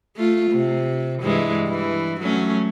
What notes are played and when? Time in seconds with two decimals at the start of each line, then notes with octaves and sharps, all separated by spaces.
0.17 A3 F4
0.51 C3
1.22 G2 E3 G#3
1.68 E3
2.20 F#3 A3 C#4